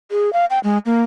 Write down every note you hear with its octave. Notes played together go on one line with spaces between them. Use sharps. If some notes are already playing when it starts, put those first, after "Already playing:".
G#4
F5
G5
G#3
A#3